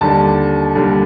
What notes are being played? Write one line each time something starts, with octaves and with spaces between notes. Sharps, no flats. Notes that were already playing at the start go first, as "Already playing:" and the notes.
D#2 D3 G3 A5
D#2 D3 G3